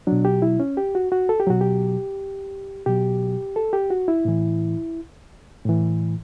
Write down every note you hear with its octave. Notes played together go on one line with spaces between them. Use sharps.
B2 F#3 D4
G4
E4
C#4
G4
F#4
F#4
A4
G4
B2 F#3 F#4
G4
B2 F#3 G4
A4
G4
F#4
E4
A2 E3
A2 E3